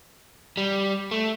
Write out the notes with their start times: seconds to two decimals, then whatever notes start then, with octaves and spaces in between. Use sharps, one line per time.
0.57 G3
1.11 A3